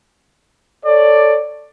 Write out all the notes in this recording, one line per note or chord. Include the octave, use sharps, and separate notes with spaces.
A4 C#5 D5